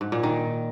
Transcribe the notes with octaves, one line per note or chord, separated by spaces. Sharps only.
G#2
A#2
D#3